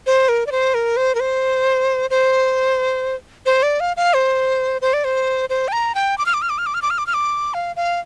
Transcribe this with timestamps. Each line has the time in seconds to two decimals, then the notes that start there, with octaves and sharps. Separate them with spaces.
0.07 C5
0.29 A#4
0.46 D5
0.52 C5
0.74 A#4
0.97 C5
1.15 A#4
1.20 C5
2.10 C5
3.46 C5
3.63 D5
3.80 F5
3.97 F5
4.14 C5
4.82 C5
4.93 D5
5.04 C5
5.50 C5
5.68 G5
5.72 A#5
5.95 G5
6.18 D6
6.26 F6
6.34 D6
6.42 F6
6.50 D6
6.58 F6
6.66 D6
6.74 F6
6.82 D6
6.90 F6
6.98 D6
7.07 F6
7.14 D6
7.54 F5
7.76 F5